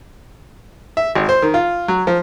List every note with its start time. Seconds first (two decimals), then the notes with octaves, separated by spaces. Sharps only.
0.97 E5
1.15 G#1
1.29 C5
1.42 D#3
1.54 F4
1.88 F#3
2.07 F3